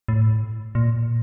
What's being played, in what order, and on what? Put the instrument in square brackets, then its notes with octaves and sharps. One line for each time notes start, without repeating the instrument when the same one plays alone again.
[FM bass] A2
A#2